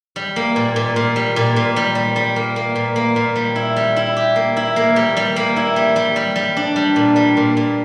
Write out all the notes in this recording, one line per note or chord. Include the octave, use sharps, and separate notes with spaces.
G3
A#3
A#2
A#2
A#2
G3
A#2
A#2
G3
G3
G3
A#3
A#3
A#2
A#3
A#2
G3
E4
G3
E4
G4
A#3
E4
A#3
G3
G3
A#3
E4
G3
G3
G3
G3
D4
G3
A#2
G3
A#2
A#2